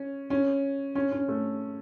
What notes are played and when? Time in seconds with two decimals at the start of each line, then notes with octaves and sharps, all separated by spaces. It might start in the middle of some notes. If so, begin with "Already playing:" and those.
Already playing: C#4
0.30 C#4
0.95 C#4
1.12 C#4
1.28 A3